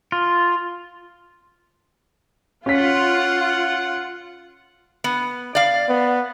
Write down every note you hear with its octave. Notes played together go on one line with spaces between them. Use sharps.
F4
C#4 F4 F#5 B6
B3
D5 F5
B3